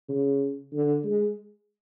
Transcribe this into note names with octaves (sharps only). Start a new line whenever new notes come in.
C#3
D3
G#3